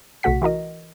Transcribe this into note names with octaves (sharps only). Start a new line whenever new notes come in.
B1 C3 A3 F#4 F#5 B6
E3 F#4 A#4 D#5